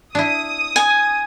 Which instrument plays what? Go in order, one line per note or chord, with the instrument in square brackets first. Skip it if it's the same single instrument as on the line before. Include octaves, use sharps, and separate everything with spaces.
[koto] D4 E4 [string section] D#6
[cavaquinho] G#5